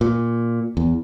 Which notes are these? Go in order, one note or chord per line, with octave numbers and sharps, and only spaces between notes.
A#2
E2